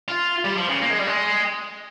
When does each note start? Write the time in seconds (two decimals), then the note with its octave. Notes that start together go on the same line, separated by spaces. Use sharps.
0.08 F4
0.45 G3
0.57 F3
0.69 C#3
0.82 A#3
0.91 G#3
0.99 G3
1.07 G#3